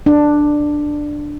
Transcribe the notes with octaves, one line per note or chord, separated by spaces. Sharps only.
D4